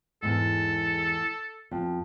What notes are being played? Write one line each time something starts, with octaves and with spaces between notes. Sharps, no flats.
E2 G#2 A4
F2